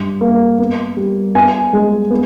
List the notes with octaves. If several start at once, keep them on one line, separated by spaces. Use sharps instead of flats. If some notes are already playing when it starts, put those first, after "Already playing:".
Already playing: G2
A#3
B3
G3
B3 G#5
G#3
B3